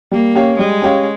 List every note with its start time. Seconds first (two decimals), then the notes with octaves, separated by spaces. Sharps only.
0.11 G3 A#3
0.35 C#4 G4 C#5 F5
0.59 G3 G#3
0.82 C#4 G4 C#5 F5